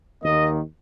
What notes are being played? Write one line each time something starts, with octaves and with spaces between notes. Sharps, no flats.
D#2 D#3 A#3 D#5